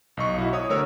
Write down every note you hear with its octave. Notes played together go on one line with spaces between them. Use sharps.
B1 D#5 C#6
E4 F#4
C#5 D#6
D3 A3 A#4 C#5 E6